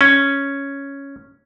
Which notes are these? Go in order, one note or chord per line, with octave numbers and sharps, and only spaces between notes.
C#4